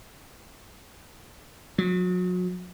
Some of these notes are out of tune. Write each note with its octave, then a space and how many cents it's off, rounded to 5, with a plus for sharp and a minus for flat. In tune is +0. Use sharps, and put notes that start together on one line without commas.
F#3 -35